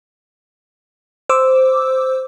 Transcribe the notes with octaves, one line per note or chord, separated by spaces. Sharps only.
C5 D6 E6